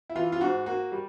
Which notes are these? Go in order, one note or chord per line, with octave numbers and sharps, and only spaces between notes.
E4
E3 F4
F4
G#2 F#4
A#3 F#4
G3